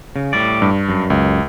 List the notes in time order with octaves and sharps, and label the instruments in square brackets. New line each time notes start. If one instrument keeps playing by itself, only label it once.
[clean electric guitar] C#3
A2 G3 D5
[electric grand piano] G2
[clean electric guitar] F#2
[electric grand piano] C#2